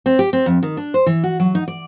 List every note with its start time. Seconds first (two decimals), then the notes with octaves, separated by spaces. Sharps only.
0.06 C4
0.19 G4
0.33 C4
0.46 F2
0.63 D#3
0.77 D4
0.94 C5
1.06 E3
1.23 F#4
1.40 F#3
1.55 D#4
1.68 D5